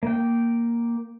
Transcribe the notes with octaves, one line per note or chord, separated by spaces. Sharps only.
A#3 G5